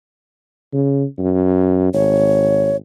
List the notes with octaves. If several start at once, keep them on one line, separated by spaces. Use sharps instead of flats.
C#3
F#2
G#1 C#5